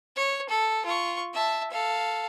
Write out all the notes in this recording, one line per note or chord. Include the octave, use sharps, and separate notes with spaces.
C#5
A4
F4 C#6
E5 A5
A4 F5